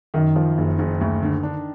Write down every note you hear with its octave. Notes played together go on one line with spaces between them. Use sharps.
F#2 D#3
F3
F#1
F#1
D2
D3
D4